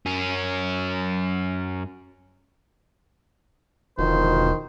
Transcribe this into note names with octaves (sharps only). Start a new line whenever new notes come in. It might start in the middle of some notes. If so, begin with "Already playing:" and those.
F#2 C#4
E1 B2 D3 D#3 F3 C5